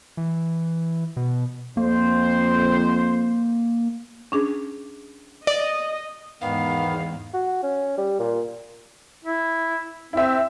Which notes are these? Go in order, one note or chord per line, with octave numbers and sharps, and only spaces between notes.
E3
B2
F2 A#3 C5
C#4 D4 G#4
D5 D#5
E2 G#2 D#3 B3 F5
F#4
C#4
G3
A#2
E4
C4 E4 E5